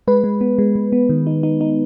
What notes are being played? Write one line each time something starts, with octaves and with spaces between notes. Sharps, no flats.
G#3 B4
G#3
B3
G#3
G#3
B3
D#3
D#4
D#4
D#4